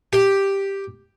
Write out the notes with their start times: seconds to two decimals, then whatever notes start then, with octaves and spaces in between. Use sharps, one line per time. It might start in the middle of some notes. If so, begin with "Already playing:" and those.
0.13 G4